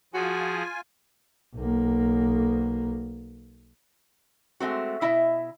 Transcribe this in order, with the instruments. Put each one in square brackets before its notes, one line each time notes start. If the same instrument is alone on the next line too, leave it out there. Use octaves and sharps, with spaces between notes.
[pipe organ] F3 G#4 [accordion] F4 G#5 [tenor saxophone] F#4
[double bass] B1 A#3
[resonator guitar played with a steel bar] G#3 A3 C4 F#4
B2 E4 D#5 E5